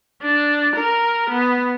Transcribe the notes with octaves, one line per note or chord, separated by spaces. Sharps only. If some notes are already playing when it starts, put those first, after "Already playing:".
D4
A#4
B3